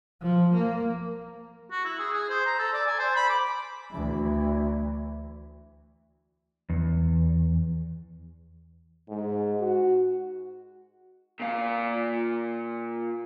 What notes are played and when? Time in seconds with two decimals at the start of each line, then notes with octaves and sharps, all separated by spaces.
0.22 F3
0.54 A#3
1.71 F#4
1.85 E4
1.99 G#4
2.14 G#4
2.30 C5
2.46 A#5
2.59 A4
2.73 D5
2.87 G#5
2.99 C5
3.16 B5
3.29 D6
3.91 D2 E3
6.70 E2
9.08 G#2
9.60 F#4
11.40 A#2 F5